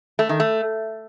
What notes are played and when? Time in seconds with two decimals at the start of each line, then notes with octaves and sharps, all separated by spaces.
0.19 A3
0.29 D#3
0.40 A3